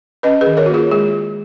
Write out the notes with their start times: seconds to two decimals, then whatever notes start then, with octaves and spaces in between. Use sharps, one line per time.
0.23 C#4 B4 D#5
0.41 G#4 B4
0.47 D#3
0.57 A#4 C#5
0.66 F#4
0.69 A#3 F4 G#4
0.91 G#3 G#4